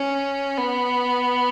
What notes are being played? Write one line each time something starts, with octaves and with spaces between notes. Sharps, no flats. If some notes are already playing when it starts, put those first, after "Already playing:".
Already playing: C#4
B3